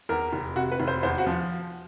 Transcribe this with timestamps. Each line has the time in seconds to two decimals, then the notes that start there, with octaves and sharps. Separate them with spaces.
0.09 E2 A#4
0.33 F1
0.56 C3 F#4
0.72 B4
0.80 F1
0.88 C5
1.03 E2 C5
1.18 F#4
1.27 F3